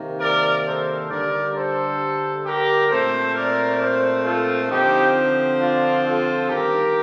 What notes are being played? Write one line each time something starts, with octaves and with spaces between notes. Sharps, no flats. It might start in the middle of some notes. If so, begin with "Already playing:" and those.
Already playing: C3 D#3 A#3
A#4 D5
A4 C5
G2 D3 G3 A#4 D5
A4 C5
G4 A#4
A#2 A3 C4 A4 C5
A#4 D5
A4 C5
F4 A4
D3 F3 C4 D#4 G4
D4 F4
F4 A4
G2 D#3 A#3 G4 A#4